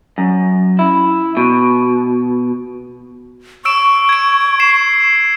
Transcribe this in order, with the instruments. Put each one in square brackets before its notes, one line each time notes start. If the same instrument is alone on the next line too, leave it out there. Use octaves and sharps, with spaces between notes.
[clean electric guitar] F#2
E4
B2
[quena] C#6 [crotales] E6 D7 E7
[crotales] G#6 D7
C7 E7